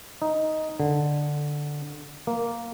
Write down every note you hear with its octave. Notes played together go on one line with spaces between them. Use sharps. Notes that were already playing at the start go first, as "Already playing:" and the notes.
D#4
D3
A#3